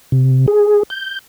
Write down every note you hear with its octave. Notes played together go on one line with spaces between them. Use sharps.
C3
G#4
G6